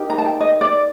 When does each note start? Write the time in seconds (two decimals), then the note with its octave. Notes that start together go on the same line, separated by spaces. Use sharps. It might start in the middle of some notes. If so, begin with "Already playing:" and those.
Already playing: D#4 G4 A#4
0.10 A#5
0.18 A5
0.25 G5
0.41 D#5
0.61 D5